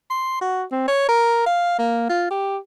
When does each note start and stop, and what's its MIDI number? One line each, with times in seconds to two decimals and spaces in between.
0.10 0.40 84
0.41 0.64 66
0.72 0.87 60
0.88 1.05 73
1.09 1.42 70
1.47 1.75 77
1.79 2.06 58
2.09 2.28 65
2.31 2.57 67